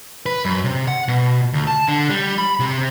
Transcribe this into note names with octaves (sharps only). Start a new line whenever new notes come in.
B4
F#2
C3
F#5
B2
D2
A5
D3
G3
B5
C3